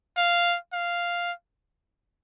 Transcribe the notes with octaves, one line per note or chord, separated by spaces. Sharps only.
F5
F5